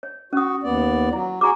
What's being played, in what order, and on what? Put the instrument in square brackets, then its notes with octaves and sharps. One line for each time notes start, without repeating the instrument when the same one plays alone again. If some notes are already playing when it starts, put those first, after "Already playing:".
[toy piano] C#5
[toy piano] C#4 D#6 [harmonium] F#4
[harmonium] D#2 B3 D5
[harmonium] F#3 [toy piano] E4
[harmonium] F#4 G#4 [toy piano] G#5 A#5 D6